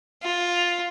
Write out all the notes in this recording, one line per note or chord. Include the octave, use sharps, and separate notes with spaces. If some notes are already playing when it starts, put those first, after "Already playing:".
F4